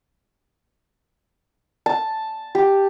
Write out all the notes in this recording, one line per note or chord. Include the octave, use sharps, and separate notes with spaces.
A5
G4